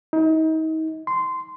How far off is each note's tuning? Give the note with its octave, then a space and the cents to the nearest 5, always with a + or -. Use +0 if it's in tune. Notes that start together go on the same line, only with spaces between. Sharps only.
D#4 +35
C6 -15